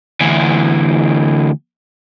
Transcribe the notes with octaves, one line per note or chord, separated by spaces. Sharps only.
D2 E3